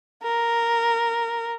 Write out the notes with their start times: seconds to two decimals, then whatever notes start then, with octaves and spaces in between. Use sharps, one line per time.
0.23 A#4